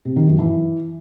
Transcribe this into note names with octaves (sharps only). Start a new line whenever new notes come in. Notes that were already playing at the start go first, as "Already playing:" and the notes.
C3
D#3
F#2
E3